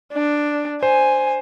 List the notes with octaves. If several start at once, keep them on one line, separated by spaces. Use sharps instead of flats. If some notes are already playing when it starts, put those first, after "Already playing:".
D4
C5 G#5